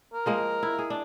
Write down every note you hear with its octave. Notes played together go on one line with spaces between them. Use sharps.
A#4
F3 G#3 A#3
E4
G#4
D4